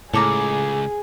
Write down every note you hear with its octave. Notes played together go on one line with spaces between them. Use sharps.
C#2 A2 G#4 A4 D5 A#5